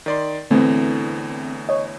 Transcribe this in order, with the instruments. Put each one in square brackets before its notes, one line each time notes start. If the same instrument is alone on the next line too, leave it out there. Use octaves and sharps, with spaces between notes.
[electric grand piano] D#3 D5 C6
[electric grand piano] E2 A2 E3 [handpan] D3 A3 [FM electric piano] C4
[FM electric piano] C#5 D#5